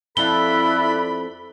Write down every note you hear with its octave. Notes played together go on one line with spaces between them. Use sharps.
F2 E4 A4 D5 E5 B5 F#6 G7